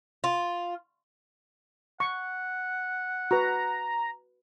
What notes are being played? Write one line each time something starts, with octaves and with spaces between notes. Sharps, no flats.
F4
F#5 C#6
F#4 B4 A#5